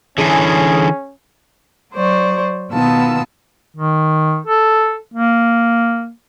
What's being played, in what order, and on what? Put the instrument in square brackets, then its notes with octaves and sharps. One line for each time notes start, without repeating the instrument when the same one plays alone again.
[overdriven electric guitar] D3 E3 [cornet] C#4 [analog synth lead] G#4
[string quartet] F#3 C5 D5 C#6
B2 D#3 B3 F4 A5 E6
[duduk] D#3
A4
A#3